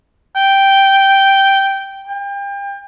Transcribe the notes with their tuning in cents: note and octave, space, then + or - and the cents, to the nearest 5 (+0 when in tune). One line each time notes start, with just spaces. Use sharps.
G5 -5
G5 +35